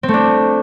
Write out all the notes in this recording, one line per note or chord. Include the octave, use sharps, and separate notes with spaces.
C4
A3
D4